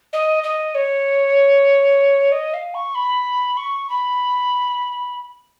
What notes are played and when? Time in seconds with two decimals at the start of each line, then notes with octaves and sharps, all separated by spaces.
0.13 D#5
0.43 D#5
0.75 C#5
2.32 D#5
2.54 F5
2.74 C#6
2.95 B5
3.57 C#6
3.89 B5